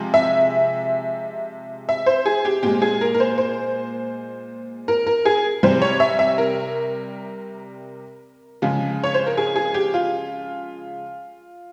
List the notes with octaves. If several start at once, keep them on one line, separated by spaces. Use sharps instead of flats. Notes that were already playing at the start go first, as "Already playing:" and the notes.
Already playing: C3 F3 G#3
E5
E5
C5
G#4
G4
A#2 G#3 G4
G#4
A#4
A#4
C5
C5
A#4
A#4
G#4
C3 G3 C5
C#5
E5
E5
A#4
C#3 F3 G#3
C#5
C5
A#4
G#4
G#4
G4
F4